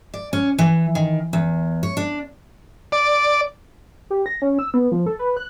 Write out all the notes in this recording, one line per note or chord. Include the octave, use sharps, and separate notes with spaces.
D5
C#4
E3
D#3
E2
C#5
D4
D5
G4
A#6
C#4
E6
B3
F3
A4
B4
F#6